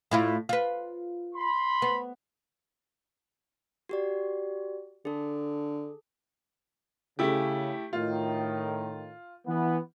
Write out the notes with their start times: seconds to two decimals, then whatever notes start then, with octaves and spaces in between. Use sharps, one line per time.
0.11 A2 E4 F4
0.49 F4 B4
1.35 B5 C6
1.82 B3
3.89 F#4 G4 D5
5.05 D3 G#4 A4
7.19 C#3 A3 E4 G4
7.93 A2 D#3 F4
9.46 E3 B3